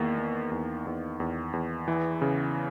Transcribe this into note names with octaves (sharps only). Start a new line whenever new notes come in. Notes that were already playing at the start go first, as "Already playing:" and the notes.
Already playing: E2 D#3 A#3
A#3
E2
E2
E2
E2
E3
C#3